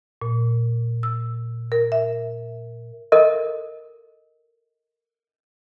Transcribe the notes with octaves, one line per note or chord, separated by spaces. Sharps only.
A#2
E6
A#4
E5
A4 A#4 D#5